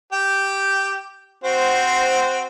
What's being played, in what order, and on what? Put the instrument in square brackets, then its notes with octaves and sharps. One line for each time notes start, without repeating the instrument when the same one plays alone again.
[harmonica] G4 G5
C4 F#4 C5